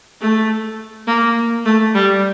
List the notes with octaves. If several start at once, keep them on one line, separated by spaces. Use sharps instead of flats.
A3
A#3
A3
G3